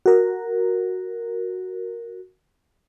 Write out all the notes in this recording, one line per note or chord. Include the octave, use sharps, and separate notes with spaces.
F#4 A#4